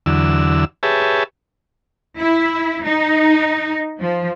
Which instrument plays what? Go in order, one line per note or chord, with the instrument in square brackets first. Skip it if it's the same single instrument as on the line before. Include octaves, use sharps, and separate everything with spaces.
[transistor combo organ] E2 D3 F#3 E6
G4 G#4 B4 C#5 E5 A5
[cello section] E4
D#4
F3